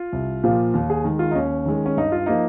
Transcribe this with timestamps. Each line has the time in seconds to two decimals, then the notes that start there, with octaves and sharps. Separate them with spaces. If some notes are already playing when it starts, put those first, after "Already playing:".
Already playing: F4
0.13 C2
0.43 A#2 F3 A#3
0.74 D#2
0.90 G#4
1.04 D#3 G#3
1.19 F4
1.31 D#4
1.35 D#2 C#4
1.66 D#3 G#3
1.86 C#4
1.97 G2 D#4
2.12 F4
2.26 F3 A#3 D#4